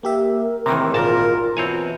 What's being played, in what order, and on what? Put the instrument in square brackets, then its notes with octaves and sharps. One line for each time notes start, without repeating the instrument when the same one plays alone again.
[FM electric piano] A#3 G4 E5 [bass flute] A#4
[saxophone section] A2 G#3 C4 [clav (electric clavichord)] C3 D#3 E3 [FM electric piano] A#5
[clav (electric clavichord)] G#1 A#2 A5 [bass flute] F4 [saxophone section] A#4
[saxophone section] B2 E3 [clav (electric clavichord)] C4 C#5 G#5